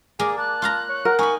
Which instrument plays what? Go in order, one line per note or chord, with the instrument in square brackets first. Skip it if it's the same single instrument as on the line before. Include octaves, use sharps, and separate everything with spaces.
[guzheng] A#3 A#4 D5 [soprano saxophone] G#4
[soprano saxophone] A5 [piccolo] F#6
[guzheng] F4 F5 A#5
[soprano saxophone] C#5
[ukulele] A#4 F#5
[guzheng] D#4 B5 [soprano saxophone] G#5 [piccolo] C#6